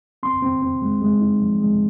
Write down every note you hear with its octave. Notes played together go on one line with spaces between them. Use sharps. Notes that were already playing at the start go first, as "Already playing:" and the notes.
C4 C6
C4
C4
G#3
G#3
D#4
F3
G#3